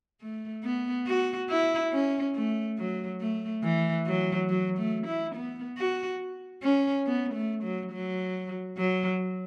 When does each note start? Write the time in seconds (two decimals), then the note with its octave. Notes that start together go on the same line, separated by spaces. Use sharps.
0.21 A3
0.64 B3
1.06 F#4
1.49 E4
1.92 C#4
2.35 A3
2.78 F#3
3.21 A3
3.63 E3
4.06 F#3
4.49 F#3
4.78 A3
5.07 E4
5.35 B3
5.77 F#4
6.63 C#4
7.06 B3
7.34 A3
7.63 F#3
7.92 F#3
8.77 F#3